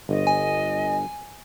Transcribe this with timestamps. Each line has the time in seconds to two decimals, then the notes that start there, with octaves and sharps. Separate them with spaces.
0.09 G1 D#5
0.27 G#5